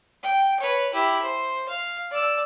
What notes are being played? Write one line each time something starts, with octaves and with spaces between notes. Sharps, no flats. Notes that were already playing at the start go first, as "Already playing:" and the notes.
G5
B4 C#5
E4 G4
C5
F5
D5 E6